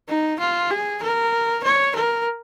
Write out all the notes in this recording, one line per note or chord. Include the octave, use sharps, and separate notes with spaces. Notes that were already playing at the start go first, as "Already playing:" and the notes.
D#4
F4
G#4
A#4
C#5
A#4